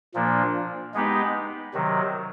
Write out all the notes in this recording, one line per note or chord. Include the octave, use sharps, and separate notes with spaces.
A#2 F3 A#3 D4
G#3 B3 D#4 G4 B4
C3 D#3 F#3